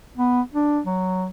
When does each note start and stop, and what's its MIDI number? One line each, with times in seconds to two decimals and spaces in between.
0.17 0.41 59
0.54 0.80 62
0.86 1.28 54